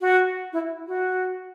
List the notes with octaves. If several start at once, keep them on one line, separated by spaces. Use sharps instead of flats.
F#4
E4
F#4